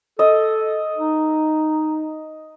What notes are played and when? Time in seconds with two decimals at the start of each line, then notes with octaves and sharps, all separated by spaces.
0.19 A4 D#5
0.97 D#4